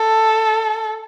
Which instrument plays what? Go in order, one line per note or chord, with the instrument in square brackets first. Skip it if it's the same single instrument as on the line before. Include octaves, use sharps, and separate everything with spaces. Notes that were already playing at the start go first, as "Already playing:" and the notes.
Already playing: [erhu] A4